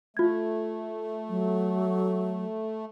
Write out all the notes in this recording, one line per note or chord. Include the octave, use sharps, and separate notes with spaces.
A3 F4 G#6
F#3